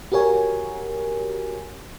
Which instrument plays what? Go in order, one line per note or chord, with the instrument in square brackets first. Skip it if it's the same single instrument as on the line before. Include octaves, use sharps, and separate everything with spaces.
[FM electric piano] F#4 G4 A#4 C#5 G#5